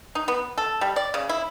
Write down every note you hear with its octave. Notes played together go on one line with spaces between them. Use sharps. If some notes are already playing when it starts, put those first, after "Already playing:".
D#4
B3
A4
G3
D5
C#3
E4